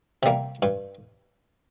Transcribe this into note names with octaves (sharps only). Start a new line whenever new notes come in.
C3 G3 A#3
G2